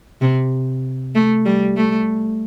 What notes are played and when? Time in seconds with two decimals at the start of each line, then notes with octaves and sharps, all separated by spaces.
0.21 C3
1.15 A3
1.46 G3
1.76 A3